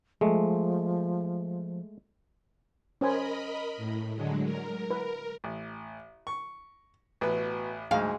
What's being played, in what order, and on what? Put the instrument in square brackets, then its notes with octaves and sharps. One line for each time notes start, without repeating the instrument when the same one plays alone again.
[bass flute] F3 [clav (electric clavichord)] G#3 A3
[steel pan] C#4 C5 G#5 [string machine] A#4 D#5 B5
[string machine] A2
D3 F#3 G#3
A#4
[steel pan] B4
[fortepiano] A1
C#6
[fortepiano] A1 B4 [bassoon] B2
[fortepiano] D2 G#2 [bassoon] G#3 [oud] F5